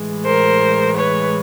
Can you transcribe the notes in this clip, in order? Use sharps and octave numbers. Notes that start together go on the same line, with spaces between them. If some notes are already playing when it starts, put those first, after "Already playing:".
Already playing: A2 E3 G#3
A#4 C5
B4 C#5